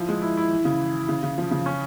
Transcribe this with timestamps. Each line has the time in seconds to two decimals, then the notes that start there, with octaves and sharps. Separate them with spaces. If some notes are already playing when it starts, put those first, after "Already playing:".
Already playing: F3 E4
0.09 G#3
0.22 E4
0.37 E4
0.51 E3
0.65 C#3
0.80 E3
0.94 E3
1.09 C#3
1.23 C#3
1.38 F3
1.51 C#3
1.66 C#4